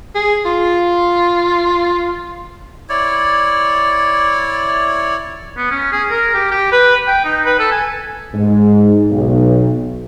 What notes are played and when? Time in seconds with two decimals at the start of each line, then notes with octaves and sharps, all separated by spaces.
0.15 G#4
0.45 F4
2.89 E4 C#5 D5
5.57 B3
5.71 C#4
5.92 G#4
6.11 A#4
6.34 G4
6.51 G4
6.72 B4
7.07 G5
7.25 D#4
7.45 B4
7.59 A4
7.72 G#5
8.34 G#2
9.10 B1